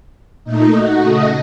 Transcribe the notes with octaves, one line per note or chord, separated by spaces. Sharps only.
A#2 A3 D#4
F#4
C#3 A3 D#5